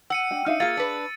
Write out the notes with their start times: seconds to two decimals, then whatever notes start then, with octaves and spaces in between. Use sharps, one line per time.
0.10 F#5 E6 C#7 D#7
0.31 D4 D#5 G5
0.46 D4 D#4 E5 F5
0.60 A#3 F4 G#4 F5 A6
0.77 D4 B4